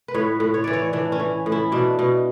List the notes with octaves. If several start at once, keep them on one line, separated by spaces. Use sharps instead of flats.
B4
A2 C#5
A2
C#5
E3 D5
C#5
E3 D4
C#4
E3
A2
E4
B2 D4
B2